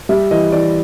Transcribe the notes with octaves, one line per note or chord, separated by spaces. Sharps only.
G3 E5
E3 D#5
E3 D5